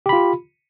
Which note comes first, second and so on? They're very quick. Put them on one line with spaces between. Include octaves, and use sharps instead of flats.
G4 B5 F4